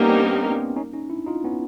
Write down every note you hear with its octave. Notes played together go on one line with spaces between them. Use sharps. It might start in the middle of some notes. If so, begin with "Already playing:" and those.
Already playing: G3 A#3 B3 C#4 D#4 G4 A#4
C4 D4
C#4 D#4
C#4 D#4
D4 E4
D#4 F4
B3 C#4